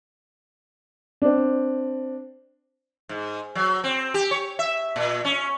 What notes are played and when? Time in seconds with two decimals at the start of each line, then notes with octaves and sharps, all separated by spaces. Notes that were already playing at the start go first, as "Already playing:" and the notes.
1.22 C4 D4
3.09 G#2
3.55 F#3
3.84 C4
4.14 G4
4.31 C#5
4.59 E5
4.96 A#2
5.25 C#4